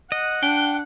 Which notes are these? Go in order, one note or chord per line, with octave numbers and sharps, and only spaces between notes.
D#5 F#5
D4 G5